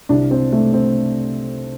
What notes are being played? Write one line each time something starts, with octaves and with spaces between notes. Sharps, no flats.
C2 C3 D4
C4
A3
C4